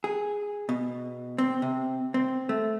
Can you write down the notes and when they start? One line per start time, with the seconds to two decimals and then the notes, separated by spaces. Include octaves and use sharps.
0.04 G#4
0.69 B2
1.38 C4
1.62 C3
2.14 C4
2.49 A3